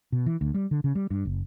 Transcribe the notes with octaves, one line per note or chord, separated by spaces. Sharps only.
B2
E3
D2
G3
D3
C#3
G3
G2
F#1